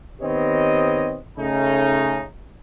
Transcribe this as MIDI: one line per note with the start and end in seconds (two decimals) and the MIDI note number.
0.22 1.17 51
0.22 1.17 59
0.22 1.17 60
0.22 1.17 67
0.22 1.17 73
0.22 1.17 75
1.38 2.24 49
1.38 2.24 57
1.38 2.24 61
1.38 2.24 63